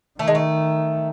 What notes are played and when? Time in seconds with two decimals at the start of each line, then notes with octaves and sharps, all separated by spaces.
0.19 D#3 A3
0.28 G#3
0.35 A3